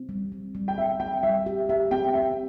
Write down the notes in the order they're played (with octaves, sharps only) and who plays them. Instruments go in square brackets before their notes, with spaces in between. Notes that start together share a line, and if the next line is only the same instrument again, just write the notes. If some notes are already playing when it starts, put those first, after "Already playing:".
Already playing: [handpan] C4
G3
G3
G3
[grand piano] G5
[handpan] C4 [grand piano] E5
[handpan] C4 [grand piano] G5
[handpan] G3 [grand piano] E5
[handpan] G4
[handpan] G4 [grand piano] E5
[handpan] C4 [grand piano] G5
[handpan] C4 [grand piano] E5